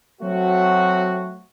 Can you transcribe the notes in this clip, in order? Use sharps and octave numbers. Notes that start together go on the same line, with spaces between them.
F#3 A3 C4 F#4